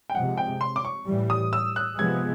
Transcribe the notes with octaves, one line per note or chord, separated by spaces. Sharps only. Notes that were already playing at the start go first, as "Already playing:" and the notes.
G5
C3 F3 G#3 F#5
G5
C6
D6
C#6
A2 E3 G3
D#6
E6
F#6
C3 F3 G#3 B3 G#6